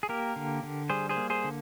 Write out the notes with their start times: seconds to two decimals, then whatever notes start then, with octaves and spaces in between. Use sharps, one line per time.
0.03 G#4
0.09 A#3 G4 A#4
0.36 D3
0.63 D3
0.90 G3 G#4 C5
1.09 G#4 C5
1.17 A#3
1.30 G#4 C5
1.44 D3